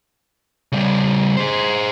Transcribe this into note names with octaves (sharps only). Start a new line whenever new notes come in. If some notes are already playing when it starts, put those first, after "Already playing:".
C#3 G3
G#4 C5